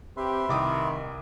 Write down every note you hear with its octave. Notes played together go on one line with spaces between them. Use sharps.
C4 G4 B4 E5 C6
C2 D#3 D6 D#6